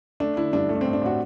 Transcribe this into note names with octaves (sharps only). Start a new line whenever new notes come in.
A3 D4
D3 E4
G2 D4
A3
D4
C4
A2
D4
A2 F#4